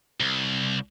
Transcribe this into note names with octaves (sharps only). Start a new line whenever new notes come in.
C2